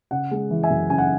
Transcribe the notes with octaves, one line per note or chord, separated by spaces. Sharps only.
C#3 F#5
G#3
E3
E5 G#5
F#2
C#3 G#5
F#5